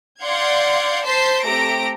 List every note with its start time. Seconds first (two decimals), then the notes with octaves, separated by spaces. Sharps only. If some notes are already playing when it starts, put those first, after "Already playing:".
0.23 D5 F5 F#5 C6 G6 G#6
1.06 C5 A5 C6 G6 B6 C7
1.43 A3 C4 G4 A#5 A#6 D7